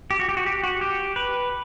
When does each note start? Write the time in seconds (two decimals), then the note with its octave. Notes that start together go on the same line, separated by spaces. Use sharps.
0.11 G4
0.20 F#4
0.29 G4
0.37 F#4
0.46 G4
0.64 F#4
0.81 G4
1.16 B4